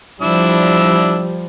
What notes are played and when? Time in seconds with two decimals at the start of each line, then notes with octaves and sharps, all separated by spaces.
0.22 F3 G3 D4 E4 E6